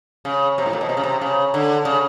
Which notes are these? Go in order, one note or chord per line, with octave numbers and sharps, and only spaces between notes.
C#3
C3
A2
A#2
B2
C3
C#3
C3
C#3
D3
C#3